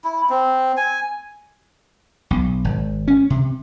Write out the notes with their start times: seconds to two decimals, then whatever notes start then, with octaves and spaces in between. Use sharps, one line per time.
0.04 E4
0.30 C4
0.77 G#5
2.31 B1
2.65 G#1
3.08 C#4
3.30 C3